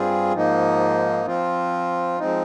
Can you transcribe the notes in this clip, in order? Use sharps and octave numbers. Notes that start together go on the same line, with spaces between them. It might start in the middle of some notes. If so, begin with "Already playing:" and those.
Already playing: G2 G3 C4 F4 G#4
G#2 F3 A#3 D#4
F3 C4 F4
F3 G#3 C4 D#4